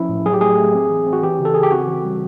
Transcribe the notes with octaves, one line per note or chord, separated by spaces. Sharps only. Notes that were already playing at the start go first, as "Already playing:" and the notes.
Already playing: F3 C#4 E4
A2
F#3 G#4
G4
A3 G#4
A3
C4
E3
C4
F#4
E3 G4
C#3
A4
C#3 G#4
G4
C4 F#4
E3
G3